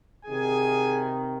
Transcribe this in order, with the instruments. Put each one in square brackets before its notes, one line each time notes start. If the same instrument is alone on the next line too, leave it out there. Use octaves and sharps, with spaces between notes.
[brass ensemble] C3 D#3 G#4 G#5